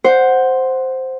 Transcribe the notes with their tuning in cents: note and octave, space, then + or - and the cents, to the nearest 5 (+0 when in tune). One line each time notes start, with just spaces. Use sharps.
C5 +0 F#5 +0